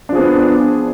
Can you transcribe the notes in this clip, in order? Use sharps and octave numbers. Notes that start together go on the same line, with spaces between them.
F3 B3 D4 G#4